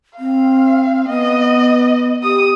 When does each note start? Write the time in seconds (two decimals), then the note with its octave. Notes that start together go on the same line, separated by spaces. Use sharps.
0.19 C4 F5
1.09 B3 D#5
2.23 G4 D#6